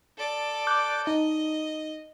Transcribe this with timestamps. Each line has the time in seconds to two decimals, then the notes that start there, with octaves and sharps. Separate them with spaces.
0.18 A4 D5
0.67 D6 F#6 G6
1.07 D#4 D#5